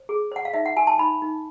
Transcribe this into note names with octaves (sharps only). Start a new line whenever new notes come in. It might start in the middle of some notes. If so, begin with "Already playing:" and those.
Already playing: C5
G#4
C5 F#5
F5
D#4 E5
F#5
F#4 G#5
A5
D#4 B5
D#4